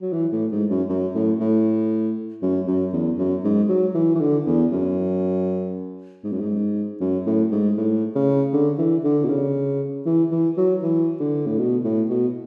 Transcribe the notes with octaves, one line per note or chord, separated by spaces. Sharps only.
F#3
E3
A2
G#2
F#2
F#2
A2
A2
F#2
F#2
E2
F#2
G#2
F#3
E3
E3
D3
E2
F#2
G#2
F#2
G#2
F#2
A2
G#2
A2
C#3
D3
E3
D3
B2
C#3
E3
E3
F#3
E3
D3
A2
B2
A2
B2